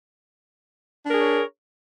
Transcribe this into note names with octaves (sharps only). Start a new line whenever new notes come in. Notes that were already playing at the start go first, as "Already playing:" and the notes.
D4 G#4 A#4 C#5